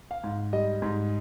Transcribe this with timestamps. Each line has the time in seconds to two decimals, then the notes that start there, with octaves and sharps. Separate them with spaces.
0.11 F5
0.24 G#2
0.53 G3 D#5
0.82 G#2